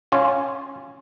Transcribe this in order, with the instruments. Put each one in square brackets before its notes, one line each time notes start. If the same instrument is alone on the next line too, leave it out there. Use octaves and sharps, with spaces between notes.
[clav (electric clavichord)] C#4 F4